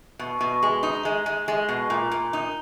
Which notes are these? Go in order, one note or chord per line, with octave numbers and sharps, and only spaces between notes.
B2
B2
G#3
D#4
G#3
G#3
G#3
B2
A#2
A#2
D#4